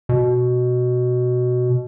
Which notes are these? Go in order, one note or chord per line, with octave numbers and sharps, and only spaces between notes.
B2